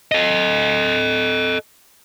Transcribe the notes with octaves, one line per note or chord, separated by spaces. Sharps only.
A4 D#5